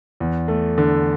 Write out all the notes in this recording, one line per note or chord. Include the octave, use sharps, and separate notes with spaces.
E2
A3
D3